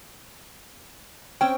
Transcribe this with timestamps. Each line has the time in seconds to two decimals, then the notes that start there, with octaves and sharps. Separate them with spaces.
1.41 C4 C#4 G5